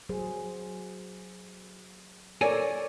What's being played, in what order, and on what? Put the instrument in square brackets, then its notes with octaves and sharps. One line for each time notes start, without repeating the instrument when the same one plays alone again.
[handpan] F#3 G#4 C5
[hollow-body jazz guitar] A4 A#4 G#5 [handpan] C#5 D5